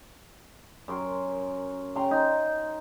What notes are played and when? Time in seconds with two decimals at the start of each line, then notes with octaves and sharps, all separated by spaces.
0.88 F#2 A#4 C6
1.96 C#3 G5 A#5 C6
2.11 D#4